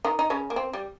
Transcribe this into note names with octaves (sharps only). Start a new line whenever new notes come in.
D#3 D#4
D#4
C#3 C#4
A#3
C4
G3